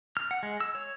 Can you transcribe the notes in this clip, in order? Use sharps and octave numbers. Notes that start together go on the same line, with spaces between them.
F6
F#5
G#3
E6
C#5